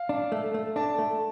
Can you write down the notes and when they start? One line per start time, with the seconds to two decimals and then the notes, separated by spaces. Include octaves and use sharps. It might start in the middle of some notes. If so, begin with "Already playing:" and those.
Already playing: F5
0.09 D4
0.32 A3
0.54 A3
0.76 D4 A5
0.99 A3